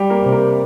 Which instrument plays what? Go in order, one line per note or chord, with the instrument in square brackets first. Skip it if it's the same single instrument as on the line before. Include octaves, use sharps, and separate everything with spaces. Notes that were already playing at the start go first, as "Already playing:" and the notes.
Already playing: [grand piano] G3 G4
A#3 A#4
[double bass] C3
[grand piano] A#3 A#4